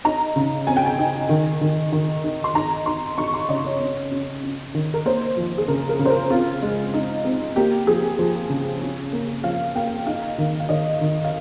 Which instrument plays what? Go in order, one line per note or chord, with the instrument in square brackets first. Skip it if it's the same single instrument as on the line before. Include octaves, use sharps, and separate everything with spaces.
[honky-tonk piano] D#4 A#5
C#3
C4 G#5
G5
G#5
D#4
D#3
D#3
D#3
D#4
C6
D#4 A#5
D#4 C6
D#4 C#6
C6
C#3 D#5
C#5
C#4
C#4
C#4
D#3
A#4
A#3 C5
F3
G#4
C#3 A#4
A#4
C#3
C5
A#4
C4 F4
G#3
D#4
C4
A#3 G4
F3 G#4
F3
C#3
C#4
A#3
F3 F5
A#3 G5
D#4 F5
D#3
F5
D#3 D#5
D#3
F5